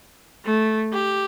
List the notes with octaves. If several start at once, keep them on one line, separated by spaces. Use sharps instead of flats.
A3
G4